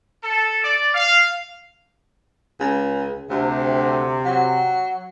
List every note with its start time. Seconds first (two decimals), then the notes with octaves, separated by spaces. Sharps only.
0.24 A4
0.64 D5
0.95 F5
2.60 C#2
3.30 D2 C3
4.25 F#3